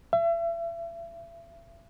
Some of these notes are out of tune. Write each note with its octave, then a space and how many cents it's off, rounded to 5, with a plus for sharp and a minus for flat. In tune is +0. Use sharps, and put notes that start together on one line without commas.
E5 +35